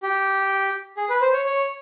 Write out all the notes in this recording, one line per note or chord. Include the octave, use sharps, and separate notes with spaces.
G4
G#4
B4
C5
C#5
C#5